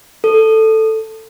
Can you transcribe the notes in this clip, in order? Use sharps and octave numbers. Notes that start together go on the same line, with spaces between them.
A4